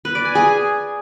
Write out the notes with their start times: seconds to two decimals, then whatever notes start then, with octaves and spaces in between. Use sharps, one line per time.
0.05 B4
0.15 D5
0.25 G#5
0.35 G#4